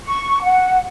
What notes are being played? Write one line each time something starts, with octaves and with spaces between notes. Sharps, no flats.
C#6
F#5